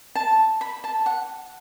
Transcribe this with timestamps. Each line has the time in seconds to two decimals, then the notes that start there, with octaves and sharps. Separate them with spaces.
0.15 A5
0.61 B5
0.84 A5
1.06 F#5